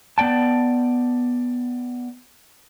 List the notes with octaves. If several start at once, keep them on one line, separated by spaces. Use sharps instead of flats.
B3 D5 G5 A5